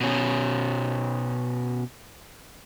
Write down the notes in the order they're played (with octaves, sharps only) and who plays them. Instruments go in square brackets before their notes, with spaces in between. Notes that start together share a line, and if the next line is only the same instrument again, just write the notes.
[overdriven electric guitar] B2 C#4